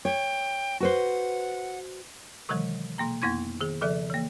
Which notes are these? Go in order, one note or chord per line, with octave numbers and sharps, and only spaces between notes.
C#5 G5
F#4 B4 C5 F#5
C3 D#3 E3 F#3 G#3
B2 A#3 A#5
F2 A#3 B3 E4 C6 G#6
D#3 G#4
C#3 F3 A4 D5 E5
E3 A#3